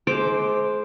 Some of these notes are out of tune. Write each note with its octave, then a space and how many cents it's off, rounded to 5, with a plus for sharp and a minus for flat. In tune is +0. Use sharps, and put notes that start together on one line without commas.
G#3 +35 C5 +0 D6 +0